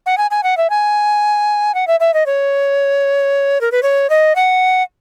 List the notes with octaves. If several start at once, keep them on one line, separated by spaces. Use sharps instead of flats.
F#5
G#5
G#5
F#5
E5
G#5
F#5
E5
E5
D#5
C#5
A#4
B4
C#5
D#5
F#5